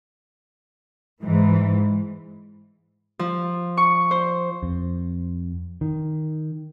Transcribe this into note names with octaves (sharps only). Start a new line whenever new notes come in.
G#2 E3
F3
C#6
C5
F2
D#3